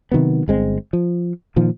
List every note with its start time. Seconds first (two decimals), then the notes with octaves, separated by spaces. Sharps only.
0.12 C3 D#3 F#3 B3
0.48 G1 G#3 C4
0.93 F3
1.56 A#2 D#3 F3